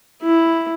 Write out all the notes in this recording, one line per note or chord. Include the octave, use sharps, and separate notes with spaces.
E4